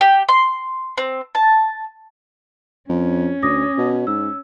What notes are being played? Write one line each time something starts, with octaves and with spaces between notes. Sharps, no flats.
G4
C6
C4
A5
F2 C#4
D2 D6 D#6 A#6
B2
G#2 E6